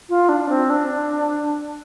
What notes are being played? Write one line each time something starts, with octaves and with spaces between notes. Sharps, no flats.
F4
D4
C4
D4